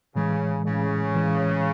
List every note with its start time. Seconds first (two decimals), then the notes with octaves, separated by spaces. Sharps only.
0.15 A2 C#3 E3 G#3
0.65 A2 C#3 E3 G#3
1.14 A2 E3 G#3